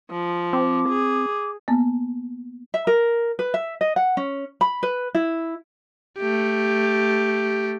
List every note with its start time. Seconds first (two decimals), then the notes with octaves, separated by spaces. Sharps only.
0.11 F3
0.53 C4 D6
0.89 G#4
1.68 A#3 B3
2.74 E5
2.87 A#4
3.39 B4
3.54 E5
3.81 D#5
3.96 F#5
4.17 C#4
4.61 B5
4.83 B4
5.15 E4
6.18 A3 G4